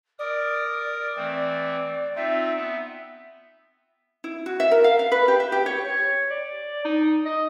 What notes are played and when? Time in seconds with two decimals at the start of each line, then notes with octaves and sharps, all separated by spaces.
0.19 A#4 D5 D#6
1.16 E3 A3 C4
2.16 C4 D#4 F4 E5
2.55 B3
4.24 E4
4.46 F#4
4.60 E5
4.71 A#4
4.84 F5
4.99 F5
5.12 B4
5.28 G4
5.40 E5
5.52 G4
5.66 C#5
5.85 C#5
6.31 D5
6.85 D#4
7.25 D#5